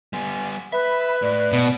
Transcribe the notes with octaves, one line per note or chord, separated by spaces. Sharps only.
G3 B3 G#5
B4 E5 B5
A2 E4 D5
B2